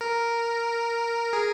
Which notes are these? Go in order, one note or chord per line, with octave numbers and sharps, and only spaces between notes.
A#4
G#4